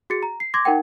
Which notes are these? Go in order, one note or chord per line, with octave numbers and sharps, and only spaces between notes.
F#4 G#4 A6 C#7
A#5
C7
C6 D6 G#6 A#6
D#4 A#4 F#5 G5